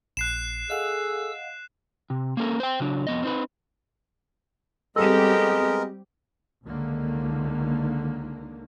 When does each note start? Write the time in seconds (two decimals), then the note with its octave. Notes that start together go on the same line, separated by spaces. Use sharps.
0.17 A#1 F#6 C7 E7
0.70 G#4 A4 D#5 F5 F#5 E6
2.10 C3
2.37 A#3 C#4 A4 A#4
2.60 C5 G5
2.80 C#3 F#3 D4
3.07 F2 B3 D#5
3.23 C4 D#4 B4
4.96 G3 G#3 B3 C4 G4 A4 A#4 D#5
6.64 C#2 D3 D#3 A#3